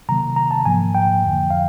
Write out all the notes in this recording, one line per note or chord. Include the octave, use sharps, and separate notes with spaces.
C3 D#3 F#3 A#3 A#5
A#5
A5
G#2 F3 A#3 G#5
G5
F2 D3 F3
F5